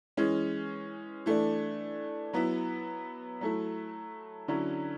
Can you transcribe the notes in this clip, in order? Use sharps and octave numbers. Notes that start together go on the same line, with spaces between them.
E3 G#3 C#4
E3 A3 D4
F#3 B3 E4
F#3 A3 E4
D3 F#3 C#4 E4